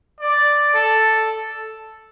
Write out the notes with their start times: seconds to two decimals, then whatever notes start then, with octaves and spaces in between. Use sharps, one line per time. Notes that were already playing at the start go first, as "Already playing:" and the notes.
0.20 D5
0.74 A4